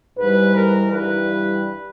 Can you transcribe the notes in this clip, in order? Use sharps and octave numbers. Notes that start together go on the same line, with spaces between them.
G#2 E3 G3 B4
A#4
G2 E3 G3 B4